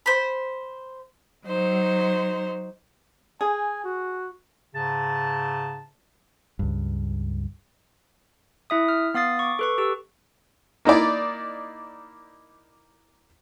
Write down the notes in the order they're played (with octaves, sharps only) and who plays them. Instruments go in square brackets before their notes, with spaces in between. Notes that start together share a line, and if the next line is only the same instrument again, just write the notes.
[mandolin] C5 B5
[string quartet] F#3 D#4 C5
[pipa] G#4 [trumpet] G#5
[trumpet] F#4
[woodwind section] G#2 C#3 A5
[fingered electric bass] C#2 G2
[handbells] E4 E5 D#6
F6
B3 F5 D#6 A6 C7
C#6 D6
A4 B4 C#6
G4 A4 E6
[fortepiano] A#3 D#4 E4 D5